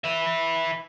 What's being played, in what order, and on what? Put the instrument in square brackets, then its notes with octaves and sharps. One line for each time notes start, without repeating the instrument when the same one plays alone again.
[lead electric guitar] B4 E5